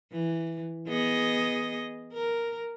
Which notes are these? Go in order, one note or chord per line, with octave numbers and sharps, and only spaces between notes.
E3
B3 G#4 D#5
A#4